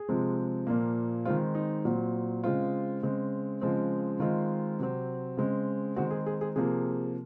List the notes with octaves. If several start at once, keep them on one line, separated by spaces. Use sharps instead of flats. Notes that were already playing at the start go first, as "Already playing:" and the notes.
Already playing: G#4
C3 F3 G#3 C4
A#2 F3 A#3
D#3 G#3 C4 F4
D#4
A#2 F#3 C4
C#3 G#3 C4 F4
C#3 G#3 C4
C#3 F3 G#3 C4
D#3 G#3 C4 F4
C3 F#3 C4
C#3 G#3 C4
D#3 G#3 C4 F#4
G#4
G#4
G#4
C3 F3 A#3 G#4